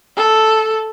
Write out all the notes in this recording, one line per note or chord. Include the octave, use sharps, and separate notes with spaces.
A4